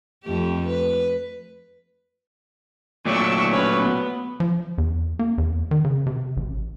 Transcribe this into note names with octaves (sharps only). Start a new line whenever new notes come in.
F2 A3 G4
B4
A#2 F#3 A3 D5 C#6 E6
C#4 B4 C#5
B3
F3
E2
A#3
E2
D#3
C#3
C3
A1